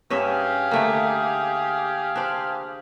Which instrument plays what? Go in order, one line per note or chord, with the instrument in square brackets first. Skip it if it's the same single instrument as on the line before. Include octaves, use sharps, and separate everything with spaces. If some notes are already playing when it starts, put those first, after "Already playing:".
[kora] G2 C#4 E5 [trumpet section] G4 G#4 F5
[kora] D3 A3 A#3
D4 C5